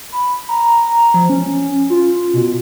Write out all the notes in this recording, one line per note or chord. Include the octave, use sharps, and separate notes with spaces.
B5
A#5
F3
C#4
F4
B2